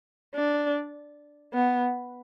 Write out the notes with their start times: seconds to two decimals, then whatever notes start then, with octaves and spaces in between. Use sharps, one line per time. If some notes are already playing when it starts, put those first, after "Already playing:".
0.35 D4
1.53 B3